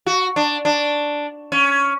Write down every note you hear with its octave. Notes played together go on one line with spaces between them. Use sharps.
F#4
D4
D4
C#4